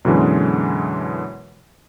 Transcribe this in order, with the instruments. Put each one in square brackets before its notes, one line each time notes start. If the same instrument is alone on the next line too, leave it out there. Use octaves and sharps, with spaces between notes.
[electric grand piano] F#2 B2 D3 E3 G#3